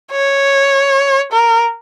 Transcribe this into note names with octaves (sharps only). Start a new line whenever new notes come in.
C#5
A#4